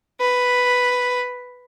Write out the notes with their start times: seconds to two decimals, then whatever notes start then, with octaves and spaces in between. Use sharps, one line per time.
0.20 B4